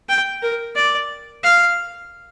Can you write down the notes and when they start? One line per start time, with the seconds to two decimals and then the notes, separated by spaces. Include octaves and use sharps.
0.09 G5
0.43 A#4
0.76 D5
1.44 F5